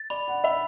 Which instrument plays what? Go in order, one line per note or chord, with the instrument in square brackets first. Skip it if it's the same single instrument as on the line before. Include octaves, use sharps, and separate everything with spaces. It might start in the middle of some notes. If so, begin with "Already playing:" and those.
Already playing: [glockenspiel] A6
[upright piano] D5 [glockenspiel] B5
[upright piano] F#5
[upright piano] E5 [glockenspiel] B5